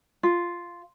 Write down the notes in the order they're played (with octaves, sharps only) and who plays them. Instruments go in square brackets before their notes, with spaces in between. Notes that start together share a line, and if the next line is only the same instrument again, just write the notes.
[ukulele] F4